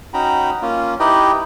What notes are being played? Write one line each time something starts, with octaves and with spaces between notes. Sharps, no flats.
C#4 D#4 F#4 G5 A#5 B5
A#3 C#4 F4
D#4 E4 G4 B4 D#5 G5